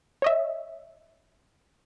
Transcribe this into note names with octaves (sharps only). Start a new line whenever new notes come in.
C#5 D#5 E5